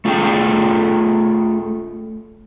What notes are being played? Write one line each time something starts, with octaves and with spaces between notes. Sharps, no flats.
A3 F4 G#4 A4 G5